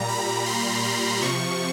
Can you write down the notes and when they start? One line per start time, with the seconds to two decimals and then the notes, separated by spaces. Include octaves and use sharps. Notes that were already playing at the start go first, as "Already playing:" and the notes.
Already playing: A#2 G3 A#5
0.08 B5
0.46 C6
0.84 C6
1.22 C3 F3 C#6